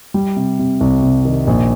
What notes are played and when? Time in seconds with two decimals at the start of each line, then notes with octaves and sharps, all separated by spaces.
0.14 G3
0.36 C3
0.59 C3
0.81 C2
1.03 C3
1.25 D#3
1.47 A#1